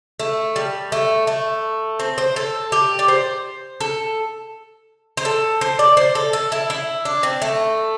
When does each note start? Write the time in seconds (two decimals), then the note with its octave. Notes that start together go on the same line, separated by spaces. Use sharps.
0.20 A3
0.56 G3
0.92 A3
1.27 A3
2.00 C4
2.18 C5
2.36 A4
2.72 G4
2.99 D5
3.08 C5
3.80 A4
5.17 C5
5.25 A4
5.61 C5
5.79 D5
5.97 C5
6.15 A4
6.33 A4
6.52 E4
6.70 E4
7.05 D4
7.23 C4
7.42 A3